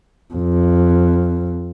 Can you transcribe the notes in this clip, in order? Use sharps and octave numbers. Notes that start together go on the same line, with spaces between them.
F2